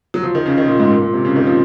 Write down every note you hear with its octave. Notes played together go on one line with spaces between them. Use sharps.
F#3
F3
D#3
C#3
D#3
A#2
G#2
A#2
A#2
C3
C#3
D#3
F3